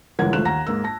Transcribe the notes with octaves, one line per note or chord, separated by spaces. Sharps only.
G1 G#2 E3 A#4 F#5 G#6
G#1 A3 F4 F#6 E7
D#2 F#5 A#5 A#6
G#2 A#3 E6
A5 A#6